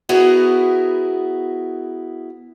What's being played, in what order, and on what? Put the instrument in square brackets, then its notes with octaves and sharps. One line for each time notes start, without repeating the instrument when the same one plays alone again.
[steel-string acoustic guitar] B3 E4 F#4 G#4 A#4